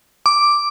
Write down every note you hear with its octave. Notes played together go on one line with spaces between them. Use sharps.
D6